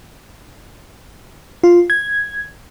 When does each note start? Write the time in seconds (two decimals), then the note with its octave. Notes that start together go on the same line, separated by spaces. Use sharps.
1.64 F4
1.90 G#6